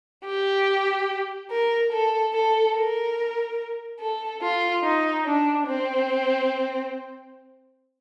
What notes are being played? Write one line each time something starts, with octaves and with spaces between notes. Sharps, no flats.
G4
A#4
A4
A4
A#4
A4
F4
D#4
D4
C4